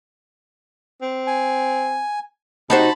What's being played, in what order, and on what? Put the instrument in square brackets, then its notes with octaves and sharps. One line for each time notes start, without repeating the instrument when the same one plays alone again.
[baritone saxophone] C4
[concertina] G#5
[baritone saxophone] C3 [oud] D#4 F#4 C5 [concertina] A5 B5